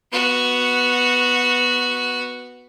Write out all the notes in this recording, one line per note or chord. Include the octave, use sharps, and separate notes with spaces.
B3 F#4